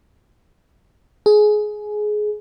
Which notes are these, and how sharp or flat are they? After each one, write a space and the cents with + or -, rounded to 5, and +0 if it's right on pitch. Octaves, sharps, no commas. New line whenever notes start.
G#4 +20